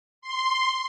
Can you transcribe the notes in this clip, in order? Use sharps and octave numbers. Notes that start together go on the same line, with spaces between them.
C6